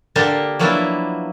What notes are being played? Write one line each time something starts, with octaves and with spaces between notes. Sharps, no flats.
D3 A#3 D4 G4 A#4 C5
F3 F#3 A#3 B3 D4 E4